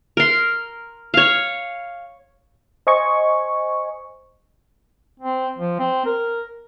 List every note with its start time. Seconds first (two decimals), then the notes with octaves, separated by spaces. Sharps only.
0.17 A#4 C6
1.14 C#5 F5
2.87 C5 D#5 G#5 C#6
5.20 C4
5.58 F3
5.79 C4
6.05 A#4